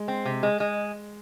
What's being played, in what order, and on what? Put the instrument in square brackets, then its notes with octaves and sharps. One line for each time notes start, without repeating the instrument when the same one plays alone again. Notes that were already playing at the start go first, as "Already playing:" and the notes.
Already playing: [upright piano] G#3
[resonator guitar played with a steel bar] C4
C3
G#3
G#3